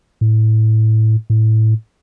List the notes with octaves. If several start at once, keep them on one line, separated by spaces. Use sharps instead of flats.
A2
A2